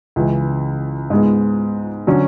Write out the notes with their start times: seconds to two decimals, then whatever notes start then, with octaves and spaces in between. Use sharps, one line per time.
0.16 C#2 C#3 E3
1.10 G#2 G#3 B3
2.07 D3 F#3 C#4